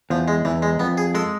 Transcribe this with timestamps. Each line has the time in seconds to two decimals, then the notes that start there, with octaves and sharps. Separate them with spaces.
0.10 E2 F3
0.28 G#3
0.45 E2 E3
0.62 G#3
0.80 F2 B3
0.98 G#4
1.15 G#3 A4